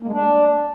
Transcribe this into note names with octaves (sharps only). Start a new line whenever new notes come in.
A#3
G#3
D4